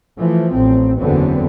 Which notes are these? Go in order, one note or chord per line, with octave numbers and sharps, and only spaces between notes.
E3 F3 A3
A1 C4
F#1 E2 D3 F#3 B3 C4